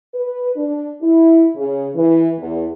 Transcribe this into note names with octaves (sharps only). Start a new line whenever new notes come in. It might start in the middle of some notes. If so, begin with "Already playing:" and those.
B4
D4
E4
C#3
E3
E2